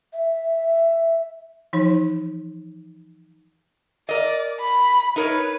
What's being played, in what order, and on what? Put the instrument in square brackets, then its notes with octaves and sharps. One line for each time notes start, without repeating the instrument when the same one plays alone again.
[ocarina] E5
[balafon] E3 F3 D#4
[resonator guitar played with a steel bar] A#4 D#5 [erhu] D5
[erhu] B5
[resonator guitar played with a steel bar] D#4 A#4 C#5 [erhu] B4